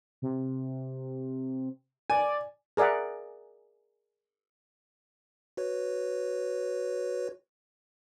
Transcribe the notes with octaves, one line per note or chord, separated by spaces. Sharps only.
C3
D5 G#5
G#4 A#4 D5 E5 F#5
F#4 B4 C#5